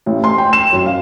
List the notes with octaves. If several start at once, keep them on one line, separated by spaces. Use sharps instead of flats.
A1
C6
G5
E7
F#2
F5